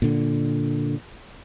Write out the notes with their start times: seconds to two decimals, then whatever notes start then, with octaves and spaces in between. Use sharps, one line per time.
0.02 A#2 D3